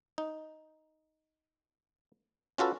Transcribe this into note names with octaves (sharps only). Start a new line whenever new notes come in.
D#4
C#4 F4 F#4 A4 B4